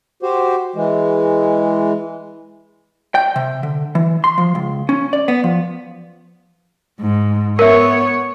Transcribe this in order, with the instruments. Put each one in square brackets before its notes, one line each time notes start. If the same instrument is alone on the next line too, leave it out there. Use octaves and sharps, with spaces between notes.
[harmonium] F#4 G4 C5
E3 G#3
[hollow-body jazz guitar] G5
C3
D3
E3
C6
F3
C#2
C#4
D5
B3
F3
[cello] G#2
[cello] B3 C#5 [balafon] A#4 E5